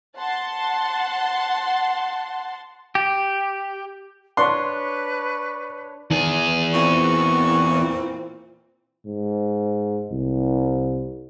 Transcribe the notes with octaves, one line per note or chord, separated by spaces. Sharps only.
F#5 A5 C6
G4
D4 B4 C#5 C6
E2 D#3 G#4
A#2 E3 C4 F#4 C#6
G#2
C2